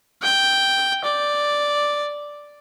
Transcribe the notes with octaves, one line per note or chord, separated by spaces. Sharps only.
G5
D5